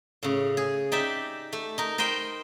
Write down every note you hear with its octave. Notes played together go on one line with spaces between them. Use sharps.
A2 C#3
G#4
D#4 G4 D5 E5
A3
D#4 A#4
A#4 C5 D#5 G5 B5